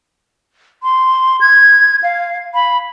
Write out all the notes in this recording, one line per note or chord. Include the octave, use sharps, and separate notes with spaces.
C6
G#6
F5
B5